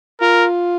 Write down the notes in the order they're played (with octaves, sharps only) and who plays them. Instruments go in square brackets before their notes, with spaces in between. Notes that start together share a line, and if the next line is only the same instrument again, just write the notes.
[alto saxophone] F4 [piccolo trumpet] A#4